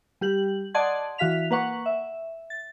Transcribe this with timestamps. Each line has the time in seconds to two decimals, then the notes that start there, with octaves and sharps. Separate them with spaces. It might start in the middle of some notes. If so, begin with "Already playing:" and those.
0.21 G3 G4 F#7
0.74 D5 D#5 F#5 A5 C6 G#6
1.18 E3 F#4 F5 B6 F7
1.51 A#3 B4 F#5 C#6
1.86 E5
2.50 A6